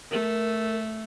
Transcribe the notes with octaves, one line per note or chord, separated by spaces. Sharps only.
A3 A#4